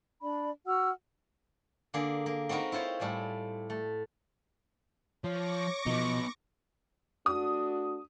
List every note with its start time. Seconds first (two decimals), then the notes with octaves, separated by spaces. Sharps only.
0.22 D4 D5 B5
0.67 F#4 F#5 E6 F6
1.94 D3 A#3 G#4
2.26 A#3
2.49 C4 D#4 F#4 A#4 B4
2.72 E4 F4 C5 C#5
3.00 A2 G3 C5 G#5
3.70 A3
5.24 F3 C#5 C#6 D6 A#6
5.86 B2 F3 B3 D#4 D#5
7.26 A3 D4 F#4 D#6